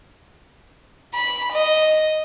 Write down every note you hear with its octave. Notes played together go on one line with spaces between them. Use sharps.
B5
D#5